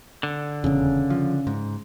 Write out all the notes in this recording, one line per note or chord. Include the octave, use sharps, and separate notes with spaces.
D3
D#1 E2 C#3
F3
G#2